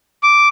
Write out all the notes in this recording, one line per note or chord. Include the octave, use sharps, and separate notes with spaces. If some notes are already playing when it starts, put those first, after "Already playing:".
D6